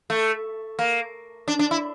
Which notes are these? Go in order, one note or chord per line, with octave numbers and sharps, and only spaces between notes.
A3
A#3
D4
D4
E4